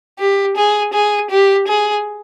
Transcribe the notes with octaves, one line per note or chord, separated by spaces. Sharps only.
G4
G#4
G#4
G4
G#4